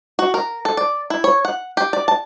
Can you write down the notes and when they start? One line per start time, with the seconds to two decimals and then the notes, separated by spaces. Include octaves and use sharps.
0.19 F#4
0.34 A#4
0.65 A4
0.77 D5
1.10 E4
1.24 C#5
1.45 F#5
1.77 G4
1.93 D5
2.08 A5